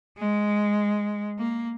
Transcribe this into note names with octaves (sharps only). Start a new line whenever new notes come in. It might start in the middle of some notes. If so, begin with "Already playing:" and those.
G#3
A#3